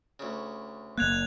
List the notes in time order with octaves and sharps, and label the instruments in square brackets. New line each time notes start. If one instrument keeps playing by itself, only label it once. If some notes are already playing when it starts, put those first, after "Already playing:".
[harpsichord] D2 C#3
[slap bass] F#1 A#3 [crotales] F#6 G#6 F7